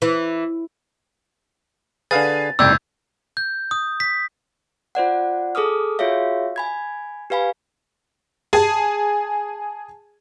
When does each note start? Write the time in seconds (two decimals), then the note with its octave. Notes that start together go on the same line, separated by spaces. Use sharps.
0.02 E3
2.11 D3 G#4 B4 F5 G#5 A6
2.59 F#1 C2 G#2 D5 G5 E6 G6 G#6
3.37 G6
3.71 D#6
4.00 B6
4.95 F4 C5 D5 F#5
5.55 G#4 A4 D6 D#6 F6
5.99 F4 F#4 G#4 C#5 E5 F5
6.56 G#5 B5 G#6
7.30 G4 B4 F5 G#5 B5
8.53 G#4 G#5 A5